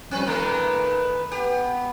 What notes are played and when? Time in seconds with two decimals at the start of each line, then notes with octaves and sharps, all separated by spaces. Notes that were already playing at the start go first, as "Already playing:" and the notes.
0.11 F3 G3 C4 C#4 B4
0.26 A#2 D#3 A3 B4
1.32 B3 G4